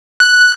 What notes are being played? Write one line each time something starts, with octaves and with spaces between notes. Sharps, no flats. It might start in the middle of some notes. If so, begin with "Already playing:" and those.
F#6